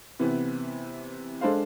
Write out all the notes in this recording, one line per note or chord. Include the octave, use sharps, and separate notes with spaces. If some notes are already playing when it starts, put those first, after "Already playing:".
C3 E3 B3
G#3 D4 A4 C5 F5